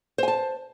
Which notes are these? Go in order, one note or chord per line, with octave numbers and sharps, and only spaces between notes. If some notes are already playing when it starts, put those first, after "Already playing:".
C5 G#5 A5